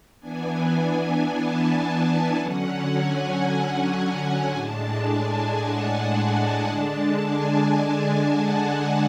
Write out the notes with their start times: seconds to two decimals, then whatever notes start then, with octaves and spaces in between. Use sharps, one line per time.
0.20 E3 B3 D4 G#5
1.28 A5
1.82 G#5
2.36 D3 F#3 C#4 F#5
2.90 G#5
3.44 G#5
4.51 A2 G#3 D4 A5
5.05 G#5
5.59 F#5
6.13 G#5
6.67 D3 G#3 D4 A5
7.21 G#5
8.29 F#5